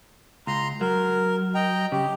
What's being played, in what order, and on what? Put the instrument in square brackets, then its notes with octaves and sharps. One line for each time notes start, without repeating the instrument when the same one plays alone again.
[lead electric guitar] C#2 [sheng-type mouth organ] A#5 C6
[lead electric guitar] F#3 [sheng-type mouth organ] A#4
[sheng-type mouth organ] D#5 G5 A#5
[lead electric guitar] C#3 [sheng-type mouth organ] G4